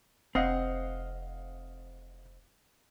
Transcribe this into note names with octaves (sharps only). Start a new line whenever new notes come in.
F1 C4 D#5 F5 F#5